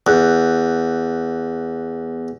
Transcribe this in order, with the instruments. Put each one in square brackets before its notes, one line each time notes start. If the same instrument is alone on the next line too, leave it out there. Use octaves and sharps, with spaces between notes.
[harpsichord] E2 [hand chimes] B3 F#6